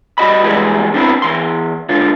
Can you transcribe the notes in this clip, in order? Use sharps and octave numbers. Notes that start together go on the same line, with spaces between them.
G3 F#4 D#5 B5
E3 G3 G#3 F#4 G#4 B4
D3 B3 C4 E4 B5
E2 E3 C6
C#2 D3 F4